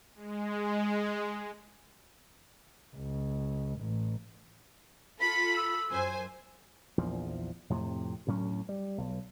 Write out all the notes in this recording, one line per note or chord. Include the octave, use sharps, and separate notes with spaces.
G#3
C#2
A1
F4 A4 B5 B6
E6
F#2 C5 G#5
A#1 E2 F3
F2 A2 C3
D2 A2 F#3 C#4
G3
B1